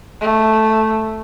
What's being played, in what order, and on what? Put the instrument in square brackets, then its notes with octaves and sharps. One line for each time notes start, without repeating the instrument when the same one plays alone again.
[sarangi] A3